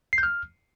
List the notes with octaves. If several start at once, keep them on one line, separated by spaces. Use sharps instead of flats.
C7
G6
F6